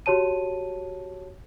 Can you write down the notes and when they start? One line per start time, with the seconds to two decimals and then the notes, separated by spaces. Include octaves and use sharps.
0.06 F#4 G4 C#5 A5 D#7